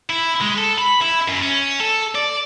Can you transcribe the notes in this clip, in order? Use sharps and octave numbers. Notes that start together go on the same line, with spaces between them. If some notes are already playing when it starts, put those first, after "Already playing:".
E4
G#3
A4
B5
E4
F#2
C#4
A4
D5